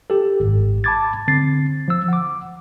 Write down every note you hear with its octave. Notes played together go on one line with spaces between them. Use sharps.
G4 A4
G#1 G#2
A5 B5 D6 G#6 A6
D3 C4 A6 C7
F3 E6
F#5 D6